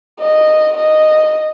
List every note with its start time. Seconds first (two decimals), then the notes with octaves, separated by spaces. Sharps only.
0.20 D#5
0.77 D#5